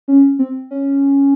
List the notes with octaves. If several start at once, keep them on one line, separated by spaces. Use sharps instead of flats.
C#4
C4
C#4